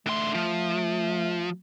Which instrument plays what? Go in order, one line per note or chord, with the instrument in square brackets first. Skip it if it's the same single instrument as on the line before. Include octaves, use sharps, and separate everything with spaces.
[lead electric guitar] D3 C6 [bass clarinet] A3
[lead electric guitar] F3